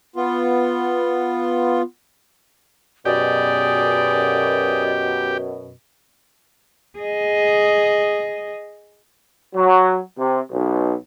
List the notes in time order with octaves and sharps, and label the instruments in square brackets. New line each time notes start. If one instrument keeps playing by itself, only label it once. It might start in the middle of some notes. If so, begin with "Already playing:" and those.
[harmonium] B3 F4
[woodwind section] F#2 B2 [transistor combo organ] G4 [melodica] G#4 [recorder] D5
[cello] G#4 D#5
[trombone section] F#3
C3
B1